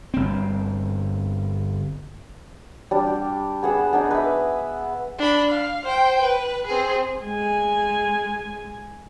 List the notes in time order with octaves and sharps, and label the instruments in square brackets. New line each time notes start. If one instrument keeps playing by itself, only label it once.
[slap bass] G1 C4
[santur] G3 D4
G4
B3 G#4 F#5 E6
B3 D4 D#4
B4 D#5 E5
[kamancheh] D4 B5
F5
C5 G5
B4
C4 G#4
[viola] G#3 G#5